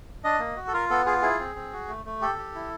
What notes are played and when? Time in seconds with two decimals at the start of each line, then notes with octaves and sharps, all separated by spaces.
0.24 D4 D#5
0.40 A#3
0.56 F#4
0.67 A4
0.73 F4 A#4
0.90 B3 A4
1.06 F4 G#4
1.22 E4 G#4
1.39 C4
1.55 C4
1.73 F#4
1.88 A3
2.06 A3
2.21 G4 A4
2.39 G4
2.55 E4